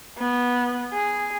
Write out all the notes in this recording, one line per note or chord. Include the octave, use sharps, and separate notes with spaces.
B3
G#4